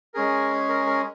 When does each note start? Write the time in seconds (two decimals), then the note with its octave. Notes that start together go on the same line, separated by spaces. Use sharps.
0.14 G#3 C#4 G#4 A#4
0.69 A#4
0.87 A#4